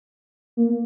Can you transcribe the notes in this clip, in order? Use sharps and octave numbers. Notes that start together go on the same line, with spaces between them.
A#3